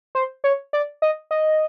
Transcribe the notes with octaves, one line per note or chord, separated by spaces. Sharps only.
C5
C#5
D5
D#5
D#5